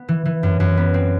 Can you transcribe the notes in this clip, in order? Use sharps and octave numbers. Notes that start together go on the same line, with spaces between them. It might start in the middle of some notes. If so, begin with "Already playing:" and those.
Already playing: B3
E3
E3
F#2
F#2
B3
C4